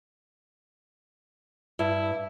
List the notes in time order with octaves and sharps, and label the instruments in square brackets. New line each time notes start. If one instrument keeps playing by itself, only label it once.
[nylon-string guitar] G2 [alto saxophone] E4